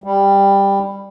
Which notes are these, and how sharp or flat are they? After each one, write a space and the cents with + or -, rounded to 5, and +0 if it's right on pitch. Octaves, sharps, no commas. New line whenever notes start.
G3 +10